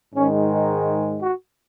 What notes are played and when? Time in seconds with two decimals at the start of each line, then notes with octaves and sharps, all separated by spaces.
0.15 G#2 D#3 G#3 C#4
0.50 D#4
1.22 F#4